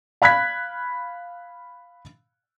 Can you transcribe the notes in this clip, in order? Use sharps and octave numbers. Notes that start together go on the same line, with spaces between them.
F5 B5 F#6 G#6 B6